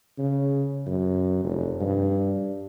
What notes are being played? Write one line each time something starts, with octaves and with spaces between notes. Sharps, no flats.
C#3
F#2
F1
G2